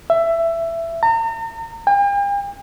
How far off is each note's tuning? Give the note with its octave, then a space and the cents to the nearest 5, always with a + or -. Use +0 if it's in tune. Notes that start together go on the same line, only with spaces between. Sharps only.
E5 +15
A#5 -40
G5 +45